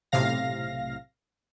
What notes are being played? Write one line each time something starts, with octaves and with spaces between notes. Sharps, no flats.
B1 A2 C3 F5 A#6